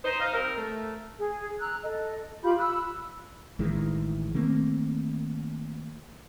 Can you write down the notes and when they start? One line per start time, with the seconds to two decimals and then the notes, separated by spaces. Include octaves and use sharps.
0.04 D#4 C5
0.20 D#4 F5
0.33 G3 C4 A#4
0.56 A3
1.19 G#4
1.60 A#5 E6 F#6
1.83 A4 D#5
2.43 F4 G4 B5 G6
2.58 B5 E6 F#6
3.59 A1 D#3 E3 G#3
4.34 D#3 A3 A#3 C4